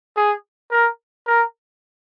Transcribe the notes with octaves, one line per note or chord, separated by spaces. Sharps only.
G#4
A#4
A#4